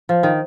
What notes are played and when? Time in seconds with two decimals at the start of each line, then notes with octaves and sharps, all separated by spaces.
0.09 F3
0.23 D#3